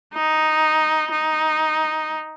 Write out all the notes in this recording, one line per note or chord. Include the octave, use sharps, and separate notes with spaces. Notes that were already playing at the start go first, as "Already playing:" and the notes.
D#4
D#4